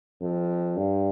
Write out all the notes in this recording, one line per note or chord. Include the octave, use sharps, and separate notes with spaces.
F2
G2